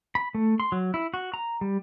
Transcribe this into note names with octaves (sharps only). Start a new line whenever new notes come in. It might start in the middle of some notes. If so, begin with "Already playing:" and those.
B5
A3
C6
F#3
E4
F#4
A#5
G3